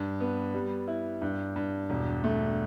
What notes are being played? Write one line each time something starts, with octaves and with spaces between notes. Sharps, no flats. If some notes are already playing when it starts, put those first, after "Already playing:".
Already playing: G2
B3
G3
E4
G2
G2
E1
A3